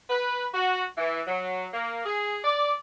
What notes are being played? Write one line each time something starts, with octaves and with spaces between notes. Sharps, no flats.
B4
F#4
E3
F#3
A#3
G#4
D5